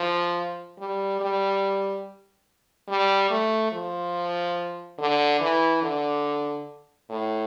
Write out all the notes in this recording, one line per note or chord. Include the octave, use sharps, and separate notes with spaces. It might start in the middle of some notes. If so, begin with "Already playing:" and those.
Already playing: F3
G3
G3
G3
A3
F3
D3
E3
D3
A2